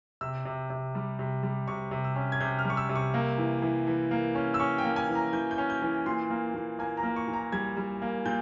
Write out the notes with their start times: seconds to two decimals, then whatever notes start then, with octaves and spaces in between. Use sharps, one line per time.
0.21 C3 E6
0.45 C3
0.70 C3
0.95 G3
1.19 C3
1.43 G3
1.68 C3 C#6
1.91 C3
2.04 E6
2.16 C#4
2.32 G#6
2.40 C3 G6
2.59 F6
2.65 G3
2.70 C#6
2.77 E6
2.89 C3
2.95 C#6
3.14 A#3
3.38 E3
3.62 E3
3.87 E3
4.11 A#3
4.35 C#4
4.54 E6
4.60 C#4 C#6
4.78 G5
4.84 A#3
4.96 G#5
5.08 E3
5.15 A#5
5.33 E3 G6
5.51 G6
5.58 C#4
5.70 G6
5.82 E3
6.06 A#2 C6
6.30 A#3
6.54 A#2
6.79 A#3 G#5
6.97 A#5
7.03 A#3
7.16 C#6
7.28 A#2
7.33 A#5
7.52 G3 G#6
7.77 G3
8.02 A#3
8.25 A#2 G6